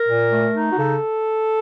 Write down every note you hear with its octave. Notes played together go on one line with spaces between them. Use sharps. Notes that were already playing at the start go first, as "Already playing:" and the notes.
Already playing: A#4
A#2
A3
D#4
F#4
C#3 A4